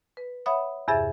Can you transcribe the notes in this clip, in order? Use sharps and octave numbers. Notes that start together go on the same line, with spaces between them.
B4
C#5 E5 F#5 B5 D#6
E2 G2 C3 G#4 E5 A6